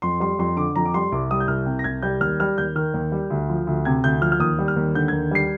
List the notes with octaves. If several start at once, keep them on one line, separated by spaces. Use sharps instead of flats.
F2 C6
G3 C6
F2 C6
D3 D6
F2 A#5
D6
G3 C6
C2 D6
G3 D#6
G6
C2 F6
C3
A#6
C2 G#6
G3 G6
D#2 F6
G3 F6
D#2 G6
D#3 F6
D#2
G3
D2
F3
D2
C3 G#6
D2 G6
F3 F6
F6
D#2 D#6
G3
F6
D#2
D3 G6
D#2 G#6
G3 C7